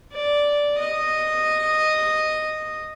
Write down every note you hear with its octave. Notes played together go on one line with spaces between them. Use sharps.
D5
D#5